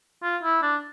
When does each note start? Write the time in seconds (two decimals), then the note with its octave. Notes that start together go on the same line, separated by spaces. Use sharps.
0.23 F4
0.44 E4
0.63 D4